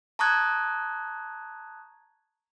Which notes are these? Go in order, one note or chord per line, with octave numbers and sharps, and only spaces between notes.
A5 A#5 C#6 D#6 F#6 G#6